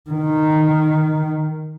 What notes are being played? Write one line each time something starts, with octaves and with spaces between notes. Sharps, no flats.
D#3